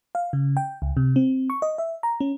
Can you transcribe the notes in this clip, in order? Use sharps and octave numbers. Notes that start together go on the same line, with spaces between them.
F5
C#3
G5
C#2
C3
C4
C#6
D#5
E5
A#5
C#4